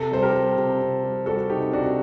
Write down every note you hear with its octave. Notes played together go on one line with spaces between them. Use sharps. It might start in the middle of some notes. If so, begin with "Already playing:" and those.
Already playing: C3 A4
G3 C5
G4 A#4
G3
C3
C3
G3
G3 F#4 A4
C3 D#4 G4
C3 D4 F#4